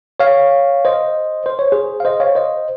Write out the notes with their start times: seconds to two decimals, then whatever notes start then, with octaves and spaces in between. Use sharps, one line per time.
0.20 C#5 F5
0.85 C5 D#5
1.46 C5
1.59 C#5
1.72 G#4 C5
2.00 F5
2.05 C5 D#5
2.20 C#5 F5
2.35 C5 D#5